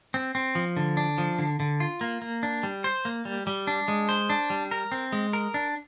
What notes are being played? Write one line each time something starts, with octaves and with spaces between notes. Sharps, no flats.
C4
C4
F3
D3
D4
F3
D3
D3
F4
A#3
A#3
D4
G3
C5
A#3
G3
G3
D4
G#3
C5
D4
G3
A#4
C4
G#3
A#4
D4